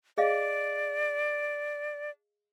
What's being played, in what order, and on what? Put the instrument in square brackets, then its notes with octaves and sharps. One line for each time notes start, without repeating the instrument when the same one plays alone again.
[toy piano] G#4 D#5 F5 [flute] D5